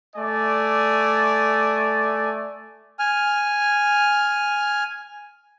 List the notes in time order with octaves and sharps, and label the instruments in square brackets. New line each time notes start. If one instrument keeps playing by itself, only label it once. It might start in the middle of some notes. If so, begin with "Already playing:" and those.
[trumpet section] A3 D5 G#5
[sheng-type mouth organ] G#5 F6